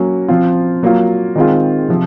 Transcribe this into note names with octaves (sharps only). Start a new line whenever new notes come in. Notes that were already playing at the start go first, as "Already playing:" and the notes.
Already playing: F#3 A#3 C#4
F3 C4 F4
F#3 A#3 F4
D#3 G#3 C4 F4
C3 F3 C4